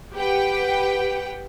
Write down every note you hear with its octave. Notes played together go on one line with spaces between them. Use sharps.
G4 B4 F#5 G5